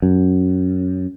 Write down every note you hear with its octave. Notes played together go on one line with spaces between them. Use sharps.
F#2